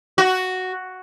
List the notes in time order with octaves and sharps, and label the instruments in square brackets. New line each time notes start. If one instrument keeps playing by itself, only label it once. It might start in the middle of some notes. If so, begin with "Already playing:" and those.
[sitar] F#4